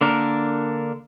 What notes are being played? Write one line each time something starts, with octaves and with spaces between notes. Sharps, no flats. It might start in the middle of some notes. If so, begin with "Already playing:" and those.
D3 A#3 D4 A#4